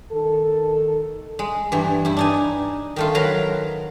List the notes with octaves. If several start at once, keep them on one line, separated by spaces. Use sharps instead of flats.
D#3 A4
G#3
G2 E3
G2 E4
D4 D#4 G#5
D#3 A3 F4
F#3 A#4 B4 F5